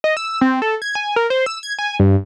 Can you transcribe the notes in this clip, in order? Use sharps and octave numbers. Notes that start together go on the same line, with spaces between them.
D#5
E6
C4
A4
G#6
G#5
A#4
C5
E6
G#6
G#5
G2